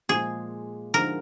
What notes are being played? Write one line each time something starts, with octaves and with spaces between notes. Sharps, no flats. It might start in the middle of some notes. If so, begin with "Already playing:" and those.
A#2 F3 G#3 G#4
D3 F3 G#3 D#4 A#4